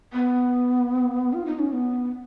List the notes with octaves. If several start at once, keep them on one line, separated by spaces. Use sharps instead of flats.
B3
F4
D#4
C#4
B3